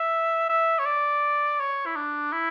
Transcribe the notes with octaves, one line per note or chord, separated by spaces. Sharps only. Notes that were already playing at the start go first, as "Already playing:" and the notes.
Already playing: E5
E5
C#5
D5
C#5
E4
D4
E4